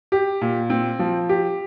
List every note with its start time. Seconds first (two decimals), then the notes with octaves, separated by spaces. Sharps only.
0.12 G4
0.41 A#2
0.70 C4
0.99 F3
1.29 G4